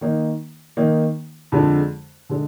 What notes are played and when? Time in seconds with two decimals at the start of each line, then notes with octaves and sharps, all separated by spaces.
0.01 D#3 A#3 D#4
0.77 D#3 A#3 D#4
1.52 F2 D3 G#3
2.29 D3 G#3